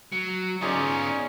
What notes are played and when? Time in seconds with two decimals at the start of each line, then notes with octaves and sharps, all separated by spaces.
0.12 F#3
0.61 B3 C#4 D#4 F4 G#4 D5